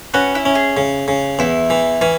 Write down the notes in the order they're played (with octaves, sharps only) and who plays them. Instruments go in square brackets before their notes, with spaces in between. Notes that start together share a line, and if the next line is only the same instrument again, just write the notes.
[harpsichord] C#4 [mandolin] F#4 B4
[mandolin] E4
[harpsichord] C#4
[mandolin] G#4
[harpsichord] C#3
C#3
[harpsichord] E2 [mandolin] E4
[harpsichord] E3
[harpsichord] E3 [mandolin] C#4